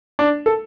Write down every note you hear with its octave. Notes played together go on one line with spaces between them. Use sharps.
D4
A4